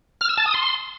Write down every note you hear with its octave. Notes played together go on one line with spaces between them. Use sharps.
F6
E6
A5
D#6
C6